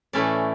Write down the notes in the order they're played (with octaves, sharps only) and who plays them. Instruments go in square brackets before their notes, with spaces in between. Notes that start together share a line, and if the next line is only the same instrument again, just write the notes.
[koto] A2 E3 A3 C#4 E4 D5